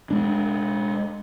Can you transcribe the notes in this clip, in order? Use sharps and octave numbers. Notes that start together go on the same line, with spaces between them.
G#3 D4